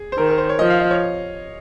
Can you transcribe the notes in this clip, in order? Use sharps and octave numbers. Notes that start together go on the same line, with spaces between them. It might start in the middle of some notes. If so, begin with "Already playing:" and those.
Already playing: G#4
C5
D#3 A#4
A#4
C5
C#5
F3 D#5
F5
D#5
C#5